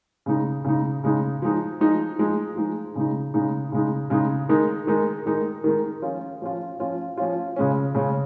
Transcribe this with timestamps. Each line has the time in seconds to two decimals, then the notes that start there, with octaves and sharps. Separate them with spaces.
0.26 C#3 G#3 D#4
0.65 C#3 G#3 D#4
1.04 C#3 G#3 D#4
1.42 F3 G#3 D#4
1.80 F3 G#3 D#4
2.18 F3 G#3 D#4
2.57 F3 G#3 D#4
2.95 C#3 G#3 D#4
3.34 C#3 G#3 D#4
3.72 C#3 G#3 D#4
4.10 C#3 G#3 D#4
4.49 D#3 G#3 D#4
4.87 D#3 G#3 D#4
5.26 D#3 G#3 D#4
5.64 D#3 G#3 D#4
6.02 F3 C#4 F4
6.42 F3 C#4 F4
6.80 F3 C#4 F4
7.17 F3 C#4 F4
7.56 C#3 G#3 C#4
7.95 C#3 G#3 C#4